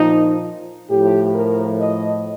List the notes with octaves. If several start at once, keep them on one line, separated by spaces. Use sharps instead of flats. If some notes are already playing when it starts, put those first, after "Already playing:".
Already playing: A#2 F3 D#4
A2 F3 G4
A#4
D#5